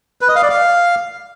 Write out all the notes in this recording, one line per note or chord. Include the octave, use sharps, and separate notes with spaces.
B4
D#5
F5
D5
F5